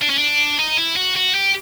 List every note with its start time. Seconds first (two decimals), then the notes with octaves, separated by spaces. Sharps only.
0.02 D4
0.10 C#4
0.18 D4
0.59 D#4
0.77 E4
0.96 F#4
1.16 F#4
1.34 G4